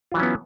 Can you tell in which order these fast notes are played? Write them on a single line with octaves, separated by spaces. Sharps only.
F4 E3 F#3 C#4 B3